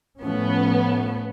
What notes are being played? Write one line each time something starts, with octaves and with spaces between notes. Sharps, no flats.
A2 F3 A3 B3 C#4